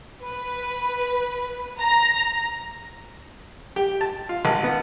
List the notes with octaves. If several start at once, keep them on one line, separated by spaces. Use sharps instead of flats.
B4
A#5
G4
A5
F4
G#1
B3